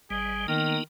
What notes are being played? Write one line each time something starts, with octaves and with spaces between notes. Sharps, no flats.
G#1 G3 G#4
D#3 A#3 B3 D#4 A#4